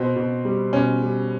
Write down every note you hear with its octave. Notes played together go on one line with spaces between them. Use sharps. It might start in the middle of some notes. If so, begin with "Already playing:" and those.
Already playing: B2 C4
B2
G3
B2 C#4
G3